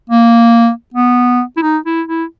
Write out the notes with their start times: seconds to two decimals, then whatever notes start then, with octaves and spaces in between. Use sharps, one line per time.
0.10 A#3
0.94 B3
1.57 E4
1.62 D#4
1.86 E4
2.08 E4